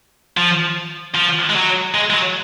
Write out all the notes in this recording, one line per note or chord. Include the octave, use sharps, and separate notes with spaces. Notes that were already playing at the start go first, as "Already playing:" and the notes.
F3
F3
G#3
F#3
G#3
G#3
F#3